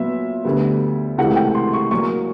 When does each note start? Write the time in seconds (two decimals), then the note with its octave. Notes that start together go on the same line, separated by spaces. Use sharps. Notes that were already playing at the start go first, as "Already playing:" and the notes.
Already playing: A#2 F#3 B3 E5
0.45 D2 D3 G3 B3
1.18 C#2 C3 E3 A3 F#5
1.36 G5
1.55 C6
1.73 C#6
1.91 A#2 F#3 A#3 C#6